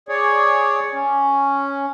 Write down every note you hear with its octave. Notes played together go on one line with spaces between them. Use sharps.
G#4 C#5 D5
C#4